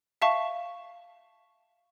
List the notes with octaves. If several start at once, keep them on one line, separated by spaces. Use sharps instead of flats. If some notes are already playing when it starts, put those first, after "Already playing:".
E5 F5 A5 C#6